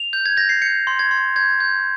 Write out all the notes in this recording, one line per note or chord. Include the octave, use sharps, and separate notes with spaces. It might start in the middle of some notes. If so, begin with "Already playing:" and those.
Already playing: F7
G6
G#6
G6 A#6
C7
G6 C#7
C6
G#6
C6
G6 G#6
G6